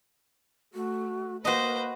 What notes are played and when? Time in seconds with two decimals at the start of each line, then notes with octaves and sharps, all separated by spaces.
0.74 A3 F#4
1.45 A#3 F#4 B4 C5 D#5